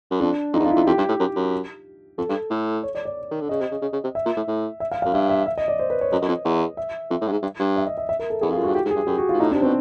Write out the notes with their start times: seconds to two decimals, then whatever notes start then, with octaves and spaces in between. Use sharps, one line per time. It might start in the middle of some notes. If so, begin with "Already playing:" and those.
0.11 F#2
0.21 F2 D4
0.53 F2 D#4
0.60 E2
0.64 F2 F4
0.71 E4
0.76 F2
0.87 F2 G4
0.98 G2
1.09 A2
1.20 F#2
1.36 F#2
2.18 F2 A4
2.29 G2
2.51 A2
2.83 C#5
2.95 D5
3.05 D5
3.31 D#3
3.41 D3
3.49 C#3 D#5
3.61 C3
3.72 C#3
3.82 C#3
3.93 C#3
4.04 C3
4.15 E5
4.26 A#2
4.37 A2
4.48 A2
4.80 E5
4.92 F5
5.02 F5
5.05 F#2
5.14 G2 E5
5.30 E5
5.46 E5
5.58 D#5
5.68 D5
5.79 C5
5.90 B4
6.01 C#5
6.12 F#2 D#5
6.22 F#2
6.28 F2
6.45 E2
6.77 E5
7.10 F2 E5
7.21 A2
7.28 G2
7.32 G#2
7.43 G2
7.60 G2
7.76 E5
7.87 D#5
7.98 E5
8.09 E5
8.19 A#4
8.30 A4
8.41 E2 G#4
8.50 F2 F4
8.58 F#2
8.63 F#4
8.67 G2
8.74 G#2 G4
8.85 G#2
8.91 G#4
8.96 G2
9.07 F#2 G4
9.18 F#4
9.29 F4
9.34 G#2
9.40 A2 D#4
9.51 D4
9.55 C3
9.62 B2 C4